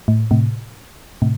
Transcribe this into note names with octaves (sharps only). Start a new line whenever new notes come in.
A2
A2 C3
A2 C3